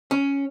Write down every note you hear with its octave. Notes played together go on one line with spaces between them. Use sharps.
C#4